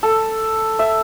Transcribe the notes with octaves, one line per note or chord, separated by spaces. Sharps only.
A4
E5